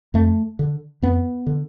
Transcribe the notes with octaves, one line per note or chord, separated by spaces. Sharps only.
F2 A3
D3
F2 B3
D3